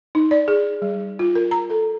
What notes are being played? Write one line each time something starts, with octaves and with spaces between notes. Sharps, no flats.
D#4
D5
G#4
G3
F4
A#4
A#5
A4